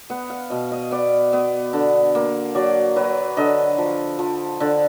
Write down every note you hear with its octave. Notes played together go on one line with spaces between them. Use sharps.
B3 F#5
F5
B2 D#5
D#5
B3 D5
B3
D3
A#3
F#3 D5
F#3 B4
D3 D#5
F3
F3
D3